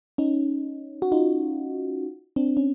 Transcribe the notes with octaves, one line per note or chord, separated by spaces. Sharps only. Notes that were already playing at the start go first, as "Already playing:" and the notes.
C#4 D#4
F#4
D#4 F4
C4 D4
C#4